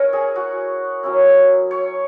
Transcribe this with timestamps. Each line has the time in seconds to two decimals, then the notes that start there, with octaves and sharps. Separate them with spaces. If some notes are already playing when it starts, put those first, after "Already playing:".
Already playing: C#4 E4 A#4 C#5
0.13 G#4
0.36 F#4
1.03 F#3 C#4 E4
1.71 C#5